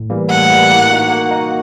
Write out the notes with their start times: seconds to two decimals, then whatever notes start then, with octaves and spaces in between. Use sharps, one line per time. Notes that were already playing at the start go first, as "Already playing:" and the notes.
Already playing: A2
0.10 E3 G3 A#3
0.30 A2 F#5
0.50 E3 G3 A#3
0.70 A#3
0.90 D#4 F#4
1.11 A#3
1.31 D#4 F#4